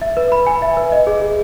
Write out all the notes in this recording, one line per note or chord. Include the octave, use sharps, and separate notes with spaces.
E5
B4
B5
G#5
E5
B4
D#5
G#4
G#4